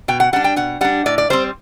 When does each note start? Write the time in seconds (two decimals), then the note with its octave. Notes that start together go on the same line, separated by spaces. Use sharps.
0.08 B2 G5
0.20 F#5
0.33 G3 D4 F#5
0.44 G5
0.56 B2 F#5
0.81 G3 D4 F#5
1.06 A2 D5
1.18 D5
1.30 G3 C4 C5